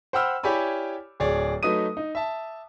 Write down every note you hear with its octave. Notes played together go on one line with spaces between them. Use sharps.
C5 F#5 G5 B5 E6 F6
E4 G4 C#5 D5 G#5 B5
D1 G#4 C#5 D5
F#3 A3 D#4 B4 D#6 D#7
D#4
E5 A5